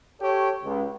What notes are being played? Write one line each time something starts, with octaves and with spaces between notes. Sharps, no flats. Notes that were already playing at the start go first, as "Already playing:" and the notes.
G4 A4 C#5
C#2